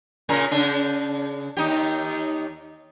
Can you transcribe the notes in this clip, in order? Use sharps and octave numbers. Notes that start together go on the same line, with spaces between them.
A#2 C#3 A#4
C#3 D4
D#2 D#4 G4